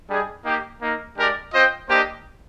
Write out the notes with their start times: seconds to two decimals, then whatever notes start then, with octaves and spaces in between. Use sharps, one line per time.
0.09 G3 D4 G#4 D#5
0.44 A#3 D#4 G4
0.80 A#3 D#4 A#4
1.17 G#3 D4 G4 A#4 D5
1.52 C4 F4 C5 D#5 G5
1.88 A#3 D4 G4 C5 D#5